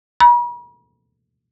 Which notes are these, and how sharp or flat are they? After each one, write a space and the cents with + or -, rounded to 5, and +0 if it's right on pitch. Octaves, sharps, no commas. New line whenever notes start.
B5 -45